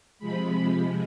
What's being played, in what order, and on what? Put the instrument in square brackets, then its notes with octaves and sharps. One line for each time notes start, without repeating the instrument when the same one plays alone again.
[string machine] C3 F3 G#3 B5